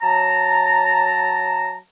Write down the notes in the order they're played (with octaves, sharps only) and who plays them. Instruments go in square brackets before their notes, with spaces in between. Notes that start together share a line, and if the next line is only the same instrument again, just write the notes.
[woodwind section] F#3 A5 A#5